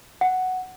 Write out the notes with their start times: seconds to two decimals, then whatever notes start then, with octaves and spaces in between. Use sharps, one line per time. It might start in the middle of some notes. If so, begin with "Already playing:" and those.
0.21 F#5